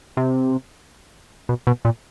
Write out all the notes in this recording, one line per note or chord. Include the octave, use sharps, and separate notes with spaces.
C3
B2
B2
A#2